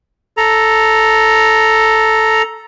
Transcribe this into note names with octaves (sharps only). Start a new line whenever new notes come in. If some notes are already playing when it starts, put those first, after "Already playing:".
A4 A#5